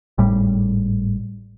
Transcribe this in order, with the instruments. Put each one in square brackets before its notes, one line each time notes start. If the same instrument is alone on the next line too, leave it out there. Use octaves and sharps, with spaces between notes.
[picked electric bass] G#1 A2 G3